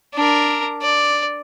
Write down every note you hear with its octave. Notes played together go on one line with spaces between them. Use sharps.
D4 A#4
D5